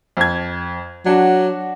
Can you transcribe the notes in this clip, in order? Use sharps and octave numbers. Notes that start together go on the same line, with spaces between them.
F2 G#6
F#3 D4 F#4